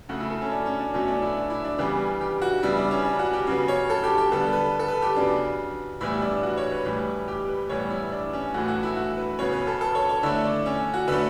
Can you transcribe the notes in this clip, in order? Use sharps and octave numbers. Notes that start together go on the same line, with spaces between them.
C#3 F#3 A3 F#4
E4
A4
C#4
D4
C#4
D4
B2 F#3 A3 C#4
D4
E4
D4
E4
D4
C#3 E3 G3 B3 G4
G4
F#4
C#3 G3 B3 E4
D4
C#4
D4
F#4
G4
C#3 F#3 B3
C#5
A4
G4
G4
D3 G3 B3 A4
B4
A4
B4
G4
C#3 F#3 B3 D4
A2 E3 G3 B3 E4
D4
F#4
C#5
B4
A2 E3 G3
G4
B4
A2 E3 G3 B3 C#5
E4
D4
C#4
A2 E3 A3 F#4
F#4
E4
F#4
B4
C#3 F#3 B3 C#5
B4
A4
A4
C#5
C#5
D3 A3 E4
D4
C#4
F#4
D3 F#3 A3 B4